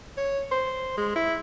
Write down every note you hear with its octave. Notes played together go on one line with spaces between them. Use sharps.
C#5
C5
G#3
E4